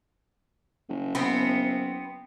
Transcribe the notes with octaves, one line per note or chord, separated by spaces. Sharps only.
F#1
B3 C4